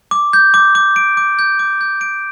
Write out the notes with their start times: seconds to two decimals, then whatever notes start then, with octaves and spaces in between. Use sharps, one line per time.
0.11 D6
0.33 G6
0.54 D6
0.75 D6
0.96 D7
1.17 D6
1.39 G6
1.59 D6
1.81 G6
2.01 D7